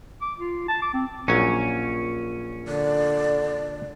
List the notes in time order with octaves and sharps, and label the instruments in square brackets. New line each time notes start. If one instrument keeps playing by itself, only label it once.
[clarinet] D6
F4
A5
D6
C4
[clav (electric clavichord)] A#1 F#3 G#5 [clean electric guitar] C#4
[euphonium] D3 [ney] D5